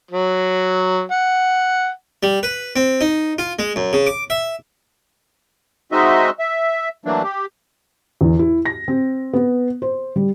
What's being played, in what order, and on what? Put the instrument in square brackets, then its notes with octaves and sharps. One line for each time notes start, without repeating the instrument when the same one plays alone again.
[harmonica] F#3
F#5
[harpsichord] G3
B4
C4
D#4
F4
G#3
F#2
C#3
D6
E5
[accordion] G#3 C4 D#4 F#4 D#5 E5
E5
E3 F#3 A3 A#3 D4
G4
[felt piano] E2
E4
A#6
C4
B3
C5
G3